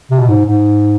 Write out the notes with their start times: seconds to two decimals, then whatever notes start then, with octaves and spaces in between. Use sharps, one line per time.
0.11 C3
0.19 B2
0.28 G#2
0.46 G#2